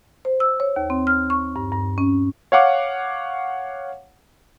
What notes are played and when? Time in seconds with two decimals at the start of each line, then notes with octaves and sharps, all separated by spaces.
0.25 C5
0.40 E6
0.60 C#5
0.76 D#2
0.90 C4
1.07 F6
1.30 C#6
1.56 G2
1.72 G2
1.98 C#4
2.52 C#5 F5 F#5 D6